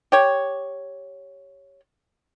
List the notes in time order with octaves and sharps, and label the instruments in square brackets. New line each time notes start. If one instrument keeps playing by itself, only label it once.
[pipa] G4 C#5